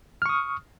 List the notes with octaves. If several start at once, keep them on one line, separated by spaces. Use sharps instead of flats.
C#6 D#6 F6